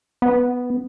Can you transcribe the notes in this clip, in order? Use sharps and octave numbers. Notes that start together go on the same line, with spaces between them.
B3